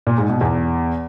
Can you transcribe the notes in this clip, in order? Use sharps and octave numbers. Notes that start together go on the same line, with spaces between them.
A#2
G#2
B2
E2